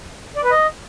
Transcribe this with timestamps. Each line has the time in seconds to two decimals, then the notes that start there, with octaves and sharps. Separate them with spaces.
0.36 D5
0.44 B4
0.51 D#5